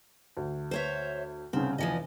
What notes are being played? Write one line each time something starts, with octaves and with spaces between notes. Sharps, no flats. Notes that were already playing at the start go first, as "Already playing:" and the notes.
D2
C5 C#5 E5
C2 C#3 C4
F1 E2 E3 F3 D#5 G#5